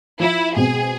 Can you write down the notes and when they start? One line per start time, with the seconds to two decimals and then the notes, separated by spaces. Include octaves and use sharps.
0.20 F3 E4 F4
0.56 B2 G#3 C4 G#4